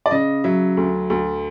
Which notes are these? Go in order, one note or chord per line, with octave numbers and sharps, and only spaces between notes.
D5
C#3 D#5
F#3 E5
D2
D2